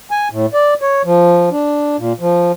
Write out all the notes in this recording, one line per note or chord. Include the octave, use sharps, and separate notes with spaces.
G#5
A2
D5
C#5
F3
D4
A#2
F3